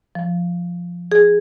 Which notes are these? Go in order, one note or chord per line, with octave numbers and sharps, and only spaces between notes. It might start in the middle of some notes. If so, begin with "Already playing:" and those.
F3
G#4